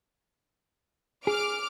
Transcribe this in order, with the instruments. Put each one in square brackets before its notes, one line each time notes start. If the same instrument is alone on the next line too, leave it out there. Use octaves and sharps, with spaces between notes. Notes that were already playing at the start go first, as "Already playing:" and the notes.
[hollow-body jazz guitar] G#4 [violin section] D6 F6 D7